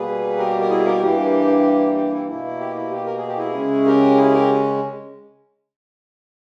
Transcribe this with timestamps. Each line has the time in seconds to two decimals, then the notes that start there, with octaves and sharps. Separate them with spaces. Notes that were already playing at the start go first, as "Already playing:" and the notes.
Already playing: B2 G3 A#3 G#4 B4
0.38 G4 A#4
0.61 A#4
0.70 E4 G#4
0.85 G4 A#4
1.02 G2 E3 A#3 G4
1.96 G4
2.12 E4
2.28 B2 A#3 E4
2.60 G4
2.76 E4
2.91 G4
3.06 A#4
3.17 G#4
3.28 G4
3.37 E4 G#4
3.54 C#3 G#3 C#4
3.86 G4 A#4
4.17 E4 G#4
4.33 G4 A#4